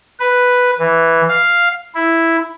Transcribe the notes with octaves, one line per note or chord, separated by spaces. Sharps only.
B4
E3
F5
E4